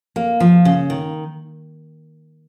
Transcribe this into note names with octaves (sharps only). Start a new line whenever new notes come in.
A#3
F3
C#3
D#3